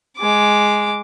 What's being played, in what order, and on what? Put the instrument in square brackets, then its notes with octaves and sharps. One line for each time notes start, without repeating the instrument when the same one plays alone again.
[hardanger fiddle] G#3 D6